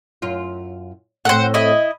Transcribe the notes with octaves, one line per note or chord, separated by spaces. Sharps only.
F#2 F4
A2 C4 A4 C5 F#5
E4 D#5